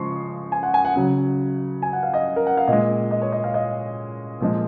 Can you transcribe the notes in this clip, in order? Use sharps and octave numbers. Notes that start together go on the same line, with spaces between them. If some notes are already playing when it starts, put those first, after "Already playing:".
Already playing: C#3 F3 G#3 C6 C#6
G#5
F#5
G#5
F#5
C#3 F#3 F#5
G#5
F#5
F5
D#5
A#4
F#5
F5
A#2 G#3 D#5
D#5
C#5
D#5
F5
D#5
A#2 F3 G#3